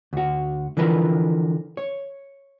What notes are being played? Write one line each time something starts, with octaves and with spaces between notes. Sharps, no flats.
D2 F#4
D3 E3 F3 A#4 B4
C#5